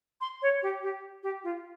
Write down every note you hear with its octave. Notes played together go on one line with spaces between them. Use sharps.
C6
C#5
G4
G4
G4
F4